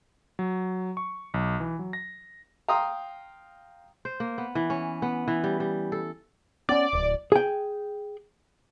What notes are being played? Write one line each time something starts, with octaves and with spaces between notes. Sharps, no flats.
F#3
C#6
B1
E3
F#3
A#6
F5 G5 A#5 C6 D#6
C5
A#3
B3
E3
C#4
B3
E3
G3
G3
A4
B3 C#4 D5
D1
G#4 G5